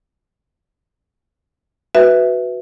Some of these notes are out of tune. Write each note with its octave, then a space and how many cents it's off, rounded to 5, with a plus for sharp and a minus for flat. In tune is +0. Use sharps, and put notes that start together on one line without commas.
F#4 +0 B4 +0 E5 +0